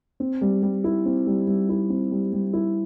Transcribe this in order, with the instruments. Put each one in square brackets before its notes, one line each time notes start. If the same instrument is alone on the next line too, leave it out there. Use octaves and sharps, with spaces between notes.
[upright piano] C4
G3
G3
E4
C4
G3
G3
E4
C4
G3
G3
E4